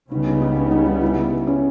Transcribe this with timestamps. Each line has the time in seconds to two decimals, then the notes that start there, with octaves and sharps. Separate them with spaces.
0.10 C#2 C#3 G3 B3 D#4
0.25 D#4
0.41 D#4
0.56 C#4
0.71 D#4
0.87 D#4
1.01 E4
1.47 C#4